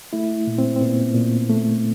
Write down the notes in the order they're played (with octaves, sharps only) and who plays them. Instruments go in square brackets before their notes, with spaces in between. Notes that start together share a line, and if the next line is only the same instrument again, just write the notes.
[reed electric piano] A3 E4
A#2
C4
C4
A#2 B3
A#2
A3